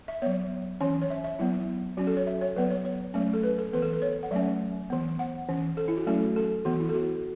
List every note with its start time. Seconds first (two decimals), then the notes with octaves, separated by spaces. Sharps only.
0.08 E5
0.22 F#3 B3 C#5
0.80 E3 C#4 C#5
1.01 C#5
1.10 E5
1.24 E5
1.39 F#3 B3 E4
1.97 F#3 C#4 F#4
2.07 A4
2.17 C#5
2.27 E5
2.41 C#5
2.56 F#3 B3 B4
2.70 C#5
2.85 C#5
3.14 F#3 A3 C#4
3.33 A4
3.44 B4
3.58 A4
3.73 E3 B3 B4
3.82 A4
3.93 B4
4.02 C#5
4.23 F#5
4.31 F#3 A3 C#4 E5
4.90 E3 B3
5.19 F#5
5.49 E3 C#4
5.77 A4
5.88 E4
5.97 F#4
6.07 F#3 A3 C#4 A4
6.36 A4
6.65 E3 B3 F#4
6.80 E4
6.89 A4
6.95 F#4